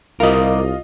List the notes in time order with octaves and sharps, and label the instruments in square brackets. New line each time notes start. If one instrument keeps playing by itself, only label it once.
[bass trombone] C2 [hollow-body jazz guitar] G3 A#4 [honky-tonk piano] F4 D#5